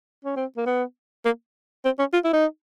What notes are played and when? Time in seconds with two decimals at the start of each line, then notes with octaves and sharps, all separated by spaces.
0.25 C#4
0.36 C4
0.57 A#3
0.66 B3
1.25 A#3
1.85 C4
1.99 C#4
2.13 F4
2.24 E4
2.33 D#4